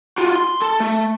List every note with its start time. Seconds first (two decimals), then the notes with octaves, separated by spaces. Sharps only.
0.18 F4 F#4
0.36 C6
0.62 A4
0.80 A3